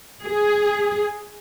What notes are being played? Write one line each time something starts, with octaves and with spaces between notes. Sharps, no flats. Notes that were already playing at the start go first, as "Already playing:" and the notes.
G#4